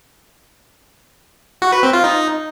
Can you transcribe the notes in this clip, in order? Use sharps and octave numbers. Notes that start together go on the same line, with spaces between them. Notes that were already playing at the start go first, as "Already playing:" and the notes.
F#4
B4
C4
F4
D#4